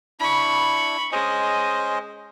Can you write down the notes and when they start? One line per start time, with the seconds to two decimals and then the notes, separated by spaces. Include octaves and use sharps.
0.20 D4 E4 B5 C#6
1.12 G#3 C#4 C5 D#5